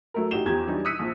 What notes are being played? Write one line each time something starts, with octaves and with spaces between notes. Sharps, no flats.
F#3 A3 A#4
A1 D#4 F#4 G4 E7 G7
E2 F3 G4 A#5 G#6
E3 F#3 G3 D4 D#4
D#6 E6 F#6 B6 C#7 D#7
A#1 F3